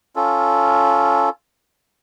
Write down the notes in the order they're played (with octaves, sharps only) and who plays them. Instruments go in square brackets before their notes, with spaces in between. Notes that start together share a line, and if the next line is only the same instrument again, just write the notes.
[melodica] C#4 F4 A4